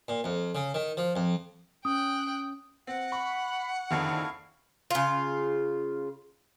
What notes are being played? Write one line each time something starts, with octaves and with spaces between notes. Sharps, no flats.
A#2
F2
C#3
D#3
F3
F2
C#4 G5 D#6 F#6
C4 F#5
B5 C#6
F#1 F2 D3 D#3 E4 F5 C#6
C#3 F4